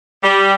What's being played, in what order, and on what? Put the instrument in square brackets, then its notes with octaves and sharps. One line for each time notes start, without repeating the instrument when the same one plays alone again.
[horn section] G3